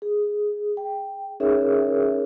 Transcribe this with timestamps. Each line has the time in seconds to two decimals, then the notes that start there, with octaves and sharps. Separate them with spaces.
0.02 G#4
0.77 G5
1.40 C#4 D#4 G#4 A#4 C#5 E5